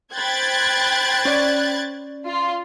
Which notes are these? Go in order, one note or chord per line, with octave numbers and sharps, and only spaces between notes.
C5 G5 B5 F#6 G#6 A6
C#4 D5
F4